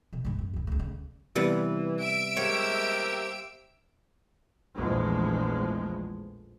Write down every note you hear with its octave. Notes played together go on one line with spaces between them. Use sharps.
B2 D3
G2 G#3
F#2 A2
C#2 A#2
C#2 A3
D2 C#3
C3 E3 G3 B3
E5 E6 D7
G#3 A#3 G4 C5 C#5
A#1 E2 A2 F3 G#3